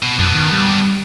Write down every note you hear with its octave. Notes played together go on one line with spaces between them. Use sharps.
B2
F#2 B3 D4
D#3
G3